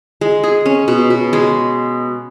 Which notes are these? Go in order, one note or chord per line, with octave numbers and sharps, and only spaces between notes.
G#3
G#4
C#4
B2
B2
G#3